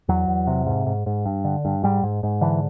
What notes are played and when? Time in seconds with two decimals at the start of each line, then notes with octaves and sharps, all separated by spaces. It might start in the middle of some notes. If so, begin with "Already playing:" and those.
0.08 E2 F#3
0.28 E2
0.47 C3
0.66 G#2
0.87 G#2
1.06 G#2
1.26 G2
1.44 D3
1.65 G2
1.83 G#2 G3
2.03 G#2
2.23 G#2
2.41 D3 E3